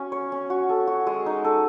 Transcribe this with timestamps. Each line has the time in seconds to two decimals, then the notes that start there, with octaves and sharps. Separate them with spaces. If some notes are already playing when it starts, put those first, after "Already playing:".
Already playing: C#4 F#4
0.12 C#5
0.32 C#4
0.50 F#4
0.70 A4
0.87 F#4
1.07 G#3
1.26 D#4
1.44 A4